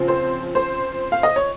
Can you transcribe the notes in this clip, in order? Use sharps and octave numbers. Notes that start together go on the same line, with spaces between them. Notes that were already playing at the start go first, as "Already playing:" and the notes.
Already playing: C#3 F3 C4
C5
C5
F5
D#5
C#5